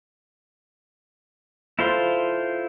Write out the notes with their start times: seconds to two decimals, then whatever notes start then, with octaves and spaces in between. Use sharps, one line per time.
1.79 E4 F4 A4 C5 C6